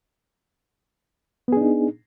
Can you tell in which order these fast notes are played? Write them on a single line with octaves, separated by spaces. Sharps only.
B3 G#4 D4 D#4